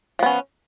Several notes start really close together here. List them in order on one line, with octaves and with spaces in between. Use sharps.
F3 B3 C#4